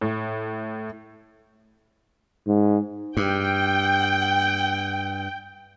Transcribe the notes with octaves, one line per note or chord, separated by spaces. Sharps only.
A2
G#2
G2 G5